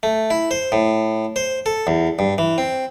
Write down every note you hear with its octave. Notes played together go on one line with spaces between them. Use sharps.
A3
E4
C5
A2
C5
A4
E2
G2
E3
C4